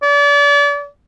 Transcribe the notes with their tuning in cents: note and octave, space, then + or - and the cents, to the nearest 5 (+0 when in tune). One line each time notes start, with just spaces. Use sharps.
D5 -35